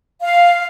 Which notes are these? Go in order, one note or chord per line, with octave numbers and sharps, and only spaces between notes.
F5